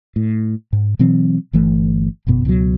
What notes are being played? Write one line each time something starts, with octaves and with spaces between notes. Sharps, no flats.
A2
G#2
B2 E3 F#3 C4
G1 E3 A3
G1 F#2 B2 B3
C#2 B2 D#3 F#3